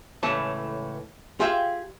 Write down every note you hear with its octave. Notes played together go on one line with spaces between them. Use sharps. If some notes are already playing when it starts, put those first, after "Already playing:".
C#2 A2 E3 A3 C#4 A5
F4 G4 G#4 E5 F5 G5